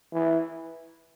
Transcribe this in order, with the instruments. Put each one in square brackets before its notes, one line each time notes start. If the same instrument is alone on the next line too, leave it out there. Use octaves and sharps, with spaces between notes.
[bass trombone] E3